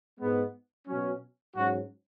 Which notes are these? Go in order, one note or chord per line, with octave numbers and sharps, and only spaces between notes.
G#2 G#3 B3
B2 F#3 C#4
G#2 F#3 C#4 F#4